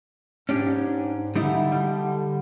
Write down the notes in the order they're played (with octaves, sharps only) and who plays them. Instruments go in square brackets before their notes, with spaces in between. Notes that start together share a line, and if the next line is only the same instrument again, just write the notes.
[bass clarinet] G#2 [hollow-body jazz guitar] C#4 D4 G4
[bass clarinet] D3 [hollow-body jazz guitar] G3 D#4 E4
[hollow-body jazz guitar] G3